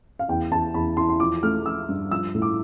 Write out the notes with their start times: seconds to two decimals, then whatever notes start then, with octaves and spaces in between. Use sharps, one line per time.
0.19 F5
0.28 E2 G5
0.51 E2 A5
0.74 E2 B5
0.97 E3 C6
1.09 C6
1.20 F3 D6
1.43 A3 F6
1.66 F3 E6
1.89 G2
2.11 F3 E6
2.34 A2
2.42 D6